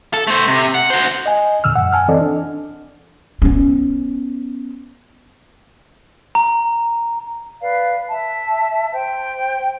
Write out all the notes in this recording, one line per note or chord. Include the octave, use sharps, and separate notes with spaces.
A4
A3 C5
C3
F#5
F#4 C5
D#5 G#5
E2 A#2 D3 E6 F6
F#2 F#5
G#5 A5 F6
E3 C4 A4 D5 D#5
D4
B3 C#4
A#5
B4 D5 F5
E5 A5
C5 G5